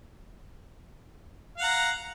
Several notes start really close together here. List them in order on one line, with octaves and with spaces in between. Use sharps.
F5 F#5 A#5